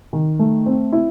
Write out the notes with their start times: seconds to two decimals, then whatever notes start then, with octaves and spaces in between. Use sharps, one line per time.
0.13 D#3
0.39 A3
0.66 C4
0.93 E4